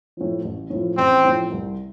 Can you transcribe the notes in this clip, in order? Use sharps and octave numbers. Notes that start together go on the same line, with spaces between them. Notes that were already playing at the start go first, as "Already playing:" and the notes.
A2 F3
A1
A2 F3
A1 C4
A2 F3
C2